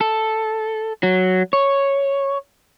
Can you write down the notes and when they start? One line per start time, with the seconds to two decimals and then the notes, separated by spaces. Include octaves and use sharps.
0.01 A4
1.03 F#3
1.53 C#5